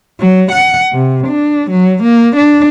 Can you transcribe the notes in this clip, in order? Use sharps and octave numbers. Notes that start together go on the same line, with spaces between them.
F#3
F#5
C3
D4
F#3
A#3
D4